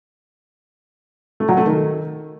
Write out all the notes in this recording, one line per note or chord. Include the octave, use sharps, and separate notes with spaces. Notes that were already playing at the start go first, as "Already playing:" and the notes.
A3
F#3
A3
D#3